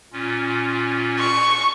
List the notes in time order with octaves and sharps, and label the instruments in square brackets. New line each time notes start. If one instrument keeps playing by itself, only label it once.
[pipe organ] A#2 C#4 F4
[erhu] C#6